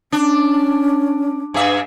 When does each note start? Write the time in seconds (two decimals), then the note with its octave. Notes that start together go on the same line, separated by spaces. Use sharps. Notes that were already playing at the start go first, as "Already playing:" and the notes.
0.12 C#4 D4
1.54 G2 G#4 E5